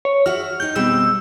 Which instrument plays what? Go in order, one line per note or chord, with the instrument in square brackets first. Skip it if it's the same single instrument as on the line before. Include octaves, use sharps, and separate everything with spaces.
[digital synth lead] C#5
[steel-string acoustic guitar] F#4 E5 F#5 [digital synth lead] F6
[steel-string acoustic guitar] D#4 G4 [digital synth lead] G6
[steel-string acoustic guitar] B2 G3 C4 [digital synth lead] E6